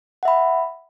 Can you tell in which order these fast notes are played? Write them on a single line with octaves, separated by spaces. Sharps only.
F#5 E5 B5